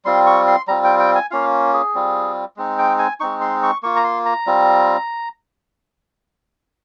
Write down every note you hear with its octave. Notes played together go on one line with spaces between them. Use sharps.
G3 C4 F4 C6
C#6
C6
G3 C4 F4 A#5
G5
G5
G#5
A#3 C#4 F4 F5
G#4
G3 C4 F4
G#3 C4 D#4
G5
G#5
G#3 C4 D#4 C#6
C6
C#6
A#3 F4 C#6
A#5
C6
A#5
G3 C4 F4